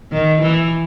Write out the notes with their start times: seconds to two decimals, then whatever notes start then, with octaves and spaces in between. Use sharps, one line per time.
0.12 D#3
0.42 E3